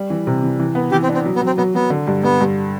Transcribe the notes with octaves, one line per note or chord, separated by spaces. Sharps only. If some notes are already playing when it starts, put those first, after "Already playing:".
Already playing: G3
E3
C3
E3
E3
B3
E3 G4
C4
D4
C4
F#3
B3
F#3
C4
F#3 B3
F#3 B3
D3
G2
G2 B3
G2